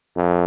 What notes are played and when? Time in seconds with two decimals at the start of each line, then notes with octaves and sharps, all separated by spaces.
0.16 F2